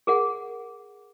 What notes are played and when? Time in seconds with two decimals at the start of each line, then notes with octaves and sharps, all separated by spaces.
0.07 G#4 A#4 F#5